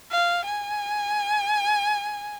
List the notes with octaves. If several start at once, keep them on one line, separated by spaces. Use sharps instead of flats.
F5
G#5